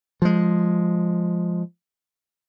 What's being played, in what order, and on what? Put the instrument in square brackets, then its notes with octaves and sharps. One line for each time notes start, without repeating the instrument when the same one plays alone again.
[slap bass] F3 G#3